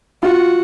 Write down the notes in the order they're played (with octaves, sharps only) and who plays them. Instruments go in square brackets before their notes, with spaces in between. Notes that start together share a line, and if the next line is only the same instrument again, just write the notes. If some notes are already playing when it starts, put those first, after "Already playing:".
[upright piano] F4 [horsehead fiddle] F#4